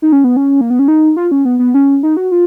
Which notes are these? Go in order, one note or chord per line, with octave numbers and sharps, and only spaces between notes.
D#4
C#4
B3
C#4
A#3
B3
C#4
D#4
F4
C#4
B3
B3
C#4
D#4
F#4
F4